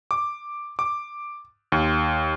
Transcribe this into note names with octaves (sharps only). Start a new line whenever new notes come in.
D6
D6
D#2